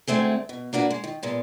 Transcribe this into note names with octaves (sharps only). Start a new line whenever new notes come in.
D2 G#3 A3 C4 G#4
B2
A#3 D4 F#4 B4 A5
G#3
D#3
A#2 G#3 B3